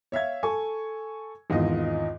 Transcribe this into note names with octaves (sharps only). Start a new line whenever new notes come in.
C#5 E5 F5 G#6
A4 G#5 C#6
G#1 E2 F4 D#5